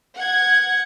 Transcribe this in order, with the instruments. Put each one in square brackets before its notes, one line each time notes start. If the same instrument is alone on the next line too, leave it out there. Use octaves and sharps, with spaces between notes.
[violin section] F#5 G#6